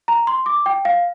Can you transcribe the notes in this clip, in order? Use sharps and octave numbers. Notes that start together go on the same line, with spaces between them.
A#5
C6
D6
G5
F5